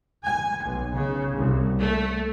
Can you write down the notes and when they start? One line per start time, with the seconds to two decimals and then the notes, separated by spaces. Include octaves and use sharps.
0.24 G#5
0.63 B1
0.93 C#3
1.35 C2
1.79 A3